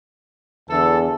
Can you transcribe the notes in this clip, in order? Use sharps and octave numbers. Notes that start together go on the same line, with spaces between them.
E2 D3 E3 A4